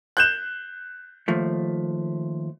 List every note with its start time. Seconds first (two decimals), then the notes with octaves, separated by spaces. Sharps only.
0.17 F#6 G6 E7
1.28 D#2 F3 A3